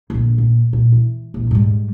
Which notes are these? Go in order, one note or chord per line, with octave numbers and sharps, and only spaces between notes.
A#1 D3
A#2
A#2
E3
A#1 E3
G#2 G3